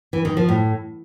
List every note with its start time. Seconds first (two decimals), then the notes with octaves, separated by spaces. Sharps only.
0.13 E3
0.25 D#3
0.37 F3
0.49 A2